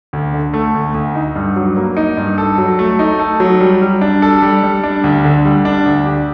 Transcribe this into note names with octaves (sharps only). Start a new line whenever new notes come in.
D2
D3
A3
D2
D2
D#4
G2
F#3
A#3
D#4
G2
A4
F#3
A3
D#4
A4
F#3
G3
G3
D4
A4
G3
G3
D4
D2
D3
G3
D4
D2
G4